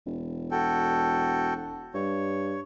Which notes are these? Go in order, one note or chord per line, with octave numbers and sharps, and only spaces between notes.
E1
F#4 A4 G5
G2 C#5